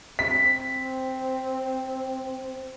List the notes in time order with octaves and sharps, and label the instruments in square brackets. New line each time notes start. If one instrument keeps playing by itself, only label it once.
[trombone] C4 [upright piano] B6